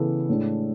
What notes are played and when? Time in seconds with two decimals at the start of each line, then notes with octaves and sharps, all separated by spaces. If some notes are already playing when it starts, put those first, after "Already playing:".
Already playing: C#3 E3 B3 E4 A4
0.29 A2 G#3 D4